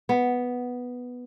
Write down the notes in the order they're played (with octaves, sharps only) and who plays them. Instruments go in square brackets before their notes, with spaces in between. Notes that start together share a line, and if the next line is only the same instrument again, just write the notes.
[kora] B3